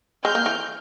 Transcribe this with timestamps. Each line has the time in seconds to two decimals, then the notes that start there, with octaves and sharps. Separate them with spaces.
0.24 G#3 F6 G6
0.35 A#3
0.46 E3